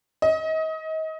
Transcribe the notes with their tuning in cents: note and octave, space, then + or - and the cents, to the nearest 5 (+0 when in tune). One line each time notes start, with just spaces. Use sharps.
D#5 +30